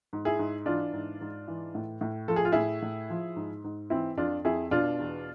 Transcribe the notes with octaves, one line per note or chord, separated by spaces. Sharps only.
G#2
E4 G#4
G#2
E3 D4 F4
G#2
G#2
E3
A2
A2
F3 A4
G#4
F4
A2 E4 G#4
A2
F3
G#2
G#2
E3 C4 E4
F2 D4 F4
F2 E4 G#4
B2 D4 F4
E2